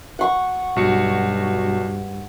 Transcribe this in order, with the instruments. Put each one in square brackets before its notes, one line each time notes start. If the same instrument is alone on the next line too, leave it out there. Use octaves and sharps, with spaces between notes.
[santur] F#5 C#6
[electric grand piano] B1 F#4 C#7 [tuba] G2